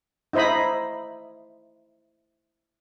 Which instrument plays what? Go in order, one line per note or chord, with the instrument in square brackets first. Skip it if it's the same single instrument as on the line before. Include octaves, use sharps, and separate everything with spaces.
[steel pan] D#4 E4 C5 D#5 B5